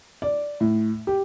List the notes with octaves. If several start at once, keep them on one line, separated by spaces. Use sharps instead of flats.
D5
A2
G4